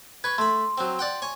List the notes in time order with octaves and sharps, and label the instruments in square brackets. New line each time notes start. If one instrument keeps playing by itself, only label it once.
[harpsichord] B4 C#6 [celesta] B5 G#6
[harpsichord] A3 B5 [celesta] C6
[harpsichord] F#3 C4
D5 F#5 G5
C#5 G#5